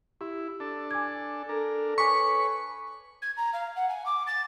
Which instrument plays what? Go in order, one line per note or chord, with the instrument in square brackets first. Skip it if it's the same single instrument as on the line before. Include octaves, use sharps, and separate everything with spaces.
[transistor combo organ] E4 [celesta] G4
[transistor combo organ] D4 A4
[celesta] G#5 D6 G#6
[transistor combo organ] D4 A#4 [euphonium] A4
[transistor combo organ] B4 C#5 [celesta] G#5 D6 B6 [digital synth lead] C#6
[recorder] G#6
A#5
F5
F#5
G#5
D6
A6